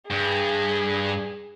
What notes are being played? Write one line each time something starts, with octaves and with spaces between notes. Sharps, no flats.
G2 G#4